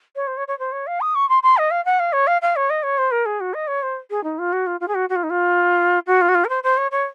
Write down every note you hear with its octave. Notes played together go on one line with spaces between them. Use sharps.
C#5
C5
C#5
C#5
C5
C#5
F5
D#6
C#6
C6
C6
D#5
F5
F#5
F5
C#5
F5
F5
C#5
D#5
C#5
C5
A#4
G#4
F#4
D#5
C#5
C5
G#4
D#4
F4
F#4
F4
F4
G#4
F#4
F#4
F4
D#4
F4
F#4
F4
F#4
F4
A#4
C5
C5
C#5
C#5